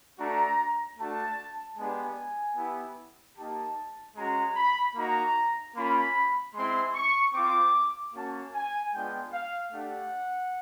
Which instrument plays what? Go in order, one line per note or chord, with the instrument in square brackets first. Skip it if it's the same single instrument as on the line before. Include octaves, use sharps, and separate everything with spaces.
[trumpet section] A3 D4 F#4 A#5
A3 D4 F#4 A5
G#3 B3 D4 G4 G#5
B3 E4 G4
A#3 D#4 G4 A5
G#3 C#4 F#4 A#5
B5
A#3 D#4 F#4 A#5
A#3 C#4 F4 B5
G#3 C4 E4 C6
C#6
C4 F4 D6
A#3 C#4 F#4 A5
G#5
G#3 B3 D4 F4 G5
F5
A3 D4 G4 F#5